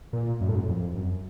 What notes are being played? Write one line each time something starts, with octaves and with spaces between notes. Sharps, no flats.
A#2
F#2
A2
F#2
F2
F#2